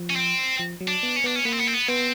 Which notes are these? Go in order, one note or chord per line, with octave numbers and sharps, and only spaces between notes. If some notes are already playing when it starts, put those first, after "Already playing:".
Already playing: F3
C#4
C4
F3
F#3
D4
B3
C#4
B3 D4
C#4
A#3 B3
C4
B3
C4
B3
B3 C4